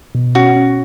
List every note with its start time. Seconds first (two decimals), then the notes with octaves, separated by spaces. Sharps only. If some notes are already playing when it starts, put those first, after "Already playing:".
0.15 B2
0.35 C#4 F#4
0.56 C#4